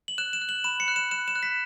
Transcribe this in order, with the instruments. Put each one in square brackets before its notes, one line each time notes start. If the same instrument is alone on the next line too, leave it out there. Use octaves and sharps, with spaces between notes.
[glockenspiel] F#7
F#6 E7
E7
F#6
F#7
B5 E7
C#7
F#6
E7
F#6 E7
E7
F#6
B6